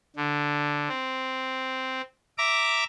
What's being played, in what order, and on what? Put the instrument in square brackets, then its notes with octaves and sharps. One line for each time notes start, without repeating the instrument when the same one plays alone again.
[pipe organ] D3
C4
E5 A#5 D6